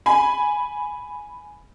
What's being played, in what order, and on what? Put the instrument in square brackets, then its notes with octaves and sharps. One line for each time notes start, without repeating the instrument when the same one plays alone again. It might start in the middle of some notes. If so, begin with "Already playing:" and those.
[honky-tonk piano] G#5 B5